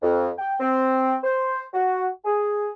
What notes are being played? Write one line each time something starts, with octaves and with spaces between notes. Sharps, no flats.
F2
G5
C4
C5
F#4
G#4